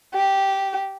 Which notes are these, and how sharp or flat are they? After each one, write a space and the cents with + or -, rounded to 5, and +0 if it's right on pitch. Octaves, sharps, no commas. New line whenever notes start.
G4 -10